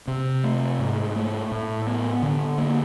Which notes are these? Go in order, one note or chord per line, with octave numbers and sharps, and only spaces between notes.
C3
A3
G#2
A3
A2
B3
D3
A#3